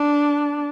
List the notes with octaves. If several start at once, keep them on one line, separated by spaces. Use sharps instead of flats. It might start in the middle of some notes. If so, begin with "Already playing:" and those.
Already playing: D4